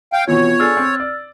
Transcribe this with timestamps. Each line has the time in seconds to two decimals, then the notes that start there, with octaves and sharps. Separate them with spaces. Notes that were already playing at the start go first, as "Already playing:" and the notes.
0.13 F5 G5
0.28 B2 E3 B3 C4 F4 C#5
0.60 D4 G#4 A4 E6 F6 A6
0.77 C4
1.00 D5